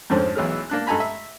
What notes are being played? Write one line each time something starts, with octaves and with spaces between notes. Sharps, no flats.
F2 G#2 D3 F3 C4 C#4
B1 E3 F#3 G#3 F6
A#3 D4 F#6
G2 A4 D#5 G#5 A#5 B5
E5